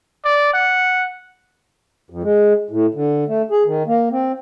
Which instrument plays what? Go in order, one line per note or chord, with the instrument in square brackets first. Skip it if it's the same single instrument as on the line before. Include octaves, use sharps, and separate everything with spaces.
[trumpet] D5
F#5
[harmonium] F2
G#3
A2
D3
A3
G#4
D#3
A#3
C4